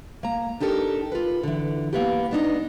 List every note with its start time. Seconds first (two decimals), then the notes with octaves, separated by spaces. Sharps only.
0.23 A#3 A#5
0.60 D4 D#4 G4 A4 A#4
1.12 F4 B4
1.43 D3 E3
1.93 A#3 B3 G4
2.31 B3 D4 D#4